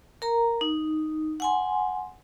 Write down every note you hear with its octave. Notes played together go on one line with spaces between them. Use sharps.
A#4 A#5
D#4
F#5 G#5 C6